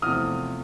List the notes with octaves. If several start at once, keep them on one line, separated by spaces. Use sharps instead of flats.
E2 C3 F3 A3 D#6 F6